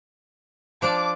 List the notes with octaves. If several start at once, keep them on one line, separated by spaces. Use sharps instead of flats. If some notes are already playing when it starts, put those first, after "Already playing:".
F3 D4 D5 D6